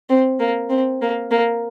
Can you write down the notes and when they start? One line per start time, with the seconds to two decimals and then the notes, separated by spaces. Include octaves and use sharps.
0.09 C4
0.40 A#3
0.70 C4
1.01 A#3
1.31 A#3